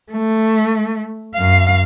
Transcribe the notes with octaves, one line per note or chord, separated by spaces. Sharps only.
A3
F#2 F5